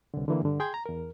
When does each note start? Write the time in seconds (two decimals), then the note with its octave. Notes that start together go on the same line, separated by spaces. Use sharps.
0.14 C2 D3
0.28 D3 E3 A#3
0.42 G2 D3
0.60 G#4 G5 C6 G6 G#6
0.74 A#5
0.86 E2 A#4